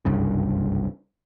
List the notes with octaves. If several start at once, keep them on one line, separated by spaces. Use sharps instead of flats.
F#1 C2 G2 C#3